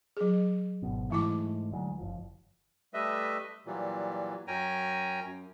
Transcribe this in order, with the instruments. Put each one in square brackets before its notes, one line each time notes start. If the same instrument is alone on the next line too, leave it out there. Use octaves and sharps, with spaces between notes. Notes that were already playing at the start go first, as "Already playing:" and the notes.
[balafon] F#3 G#4
[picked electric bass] G#1 B2
[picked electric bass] G#2 G#3 A3 [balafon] E3 E4 D6
[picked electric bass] D2 F#3 G#3
F#1 F3
[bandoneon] G3 A3 B4 D#5 E5
A#2 E3 F#3 G3
F#2 C#4 G5 G#5 A#5
F#2